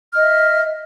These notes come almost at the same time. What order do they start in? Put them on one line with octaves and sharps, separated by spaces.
F6 D#5 E5